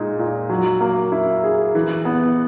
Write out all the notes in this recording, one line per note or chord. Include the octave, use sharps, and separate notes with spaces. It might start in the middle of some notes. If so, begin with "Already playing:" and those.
Already playing: A#2 G#3 D#4
A#2
F#3
A#3
E4
G#4
E3
B3